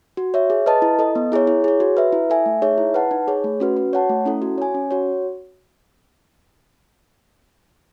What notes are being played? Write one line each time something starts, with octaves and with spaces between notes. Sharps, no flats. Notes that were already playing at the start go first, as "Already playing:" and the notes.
F#4
C#5 E5
G#4
B4 D#5 A5
E4
A4 D#5
B3
E4 G#4 C#5
E4
G#4 C#5
F#4
B4 E5
E4
A4 E5 G#5
A3
D#4 G#4 C#5 E5
E4
B4 F#5 A5
D#4
G#4 C#5
A3
C#4 F#4 B4
F#4
C#5 F#5 A5
A3
C#4 E4 A4
F#4
C#5 G#5
C#4
F#4 C#5